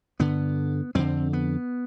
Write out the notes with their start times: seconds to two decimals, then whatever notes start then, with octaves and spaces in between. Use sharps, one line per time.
0.19 G2 D3 B3
0.95 F2 D3 C4
1.33 B3